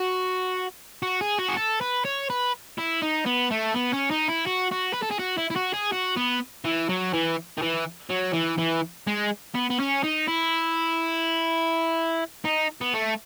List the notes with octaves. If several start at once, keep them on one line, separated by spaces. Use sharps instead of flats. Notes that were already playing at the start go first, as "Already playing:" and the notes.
Already playing: F#4
F#4
G#4
F#4
G#4
A4
B4
C#5
B4
E4
D#4
B3
A3
B3
C#4
D#4
E4
F#4
F#4
B4
A4
G#4
F#4
E4
E4
F#4
G#4
F#4
B3
E3
F#3
E3
D#3
E3
F#3
E3
E3
G#3
B3
B3
C#4
D#4
E4
D#4
B3
A3